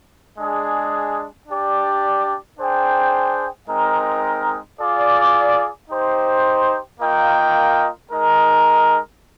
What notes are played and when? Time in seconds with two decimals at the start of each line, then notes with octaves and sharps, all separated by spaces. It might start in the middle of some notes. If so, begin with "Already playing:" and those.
0.38 G#3 D4 G#4
1.48 D4 G4 D5
2.58 D4 G#4 C5 G5
3.69 G#3 C4 D#4 A#4
4.79 F4 G#4 D5
5.89 D#4 G4 C5
6.99 A#3 F4 A#4 D#5 G5
8.11 G#3 D#4 A#4